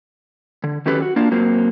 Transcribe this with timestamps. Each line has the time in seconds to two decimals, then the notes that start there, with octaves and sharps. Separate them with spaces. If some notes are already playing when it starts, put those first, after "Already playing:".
0.64 D3
0.86 D#3 F#3 C#4 G4 A4 B4
1.02 F#4
1.16 A#3 D4 F4
1.31 F#3 A#3 C4